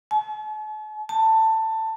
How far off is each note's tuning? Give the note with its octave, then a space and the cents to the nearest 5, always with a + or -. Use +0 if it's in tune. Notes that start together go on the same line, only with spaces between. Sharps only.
A5 -45
A5 +15